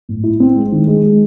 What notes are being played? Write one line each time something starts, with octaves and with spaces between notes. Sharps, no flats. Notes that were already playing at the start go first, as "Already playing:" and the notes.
A2
E4
C4
G#3
D#3
G#3
G#3